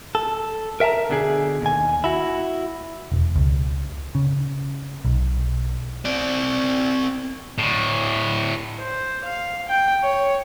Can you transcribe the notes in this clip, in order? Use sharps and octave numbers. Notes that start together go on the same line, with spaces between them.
A4
A#4 E5 G5 A5 A#5
B2 D3 G#4
D#2 G#5
E4 F#4
E1
C#2
C#3
B1
C4 D5
A2 D3
C5
F5
G5
C#5